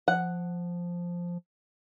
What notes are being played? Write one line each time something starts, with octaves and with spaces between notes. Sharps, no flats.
F3 F#5